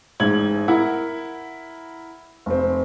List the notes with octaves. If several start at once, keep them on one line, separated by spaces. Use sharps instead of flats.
A1 G#2 G#6 F#7
E4 A#4 F#5
F1 C4